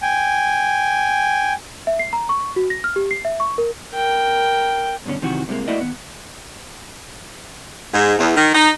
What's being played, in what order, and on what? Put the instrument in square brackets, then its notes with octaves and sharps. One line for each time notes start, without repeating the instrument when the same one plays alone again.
[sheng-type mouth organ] G5 G#5
[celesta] E5
C7
A#5
C#6
F#4
A#6
F6
G4
C7
E5
C#6
A#4
[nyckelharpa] A#4 G5
[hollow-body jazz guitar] G2 B2 D3 C#4
F#2 C3 D#3 E3 F#4
C2 C3 F#3 G#3 A#3
A3 A#3 E4 F#4 D5 D#5
D#2 C3 B3
[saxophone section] G#2
E2
D#3
D#4